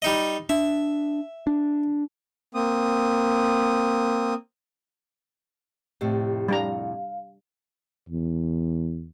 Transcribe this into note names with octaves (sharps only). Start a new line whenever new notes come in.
G3 D#4 D#5
D4 E5
D4
A#3 C4 D#6
F2 A2 C3 G4
G3 D4 F5 A#5
E2